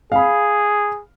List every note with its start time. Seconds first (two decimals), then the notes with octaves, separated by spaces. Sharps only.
0.12 G#4 F5 B5